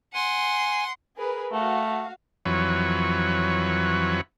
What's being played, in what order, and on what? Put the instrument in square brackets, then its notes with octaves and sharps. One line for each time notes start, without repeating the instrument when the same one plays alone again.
[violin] F#5 C6 [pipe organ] G#5
[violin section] G#4 A#4 B4
[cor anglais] A3 [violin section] F#4 F5
[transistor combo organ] F2 E3 F#3 B4 C#5